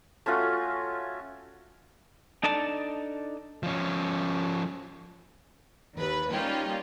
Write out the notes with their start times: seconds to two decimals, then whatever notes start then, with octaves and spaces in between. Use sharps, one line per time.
0.26 A3 C#4 F4 F#4
2.43 D4 D#4 A4 D5 A5
3.63 F3 C#4
5.95 D#2 B4
6.31 G3 A#3 C#4 D#4 F4 G4